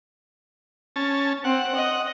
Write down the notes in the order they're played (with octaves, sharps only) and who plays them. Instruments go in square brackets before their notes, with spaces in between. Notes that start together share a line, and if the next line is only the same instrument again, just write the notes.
[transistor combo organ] C#4 A5
[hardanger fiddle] C4 [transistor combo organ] F#5
[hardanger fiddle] D#5